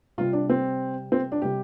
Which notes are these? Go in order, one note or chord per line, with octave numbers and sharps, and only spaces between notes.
C3 G3 F4
D4
C4
C4
D4
C3 G3 G4